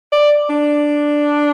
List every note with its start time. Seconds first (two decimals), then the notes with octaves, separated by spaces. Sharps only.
0.12 D5
0.49 D4